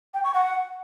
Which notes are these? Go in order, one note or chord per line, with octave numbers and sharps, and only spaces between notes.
G5
C#6
F#5